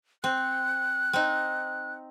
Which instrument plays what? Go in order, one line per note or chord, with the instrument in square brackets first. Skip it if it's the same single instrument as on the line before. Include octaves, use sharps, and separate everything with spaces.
[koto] C4 [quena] F#6
[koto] C4 D#4